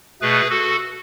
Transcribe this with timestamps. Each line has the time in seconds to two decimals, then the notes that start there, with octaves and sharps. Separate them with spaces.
0.21 B2 A3 G#4 B4
0.50 F#4 A4